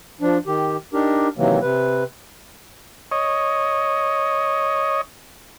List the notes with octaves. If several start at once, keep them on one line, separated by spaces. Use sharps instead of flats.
F3 D4
D#3 G4
D4 D#4 G4 A#4
C3 D#3 E3 F#3 A#3
C3 B4
C#5 D#5